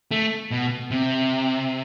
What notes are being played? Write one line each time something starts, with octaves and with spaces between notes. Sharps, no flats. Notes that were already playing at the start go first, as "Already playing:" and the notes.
A3
B2
C3